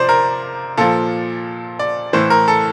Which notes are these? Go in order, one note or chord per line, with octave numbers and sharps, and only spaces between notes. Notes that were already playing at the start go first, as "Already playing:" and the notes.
Already playing: C3 F3 C5 D5
A#4
A#2 F3 A4
D5
A2 E3 C5
A#4
A4